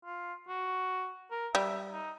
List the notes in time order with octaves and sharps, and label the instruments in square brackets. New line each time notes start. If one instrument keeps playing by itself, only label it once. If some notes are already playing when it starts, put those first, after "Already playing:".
[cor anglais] F4
F#4
A#4
[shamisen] G3 [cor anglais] E5
[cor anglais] D#4